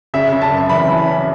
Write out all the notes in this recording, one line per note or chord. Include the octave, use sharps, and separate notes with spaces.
C#3 E5
C#3
A5
F#2
E3 B5
E3
C#4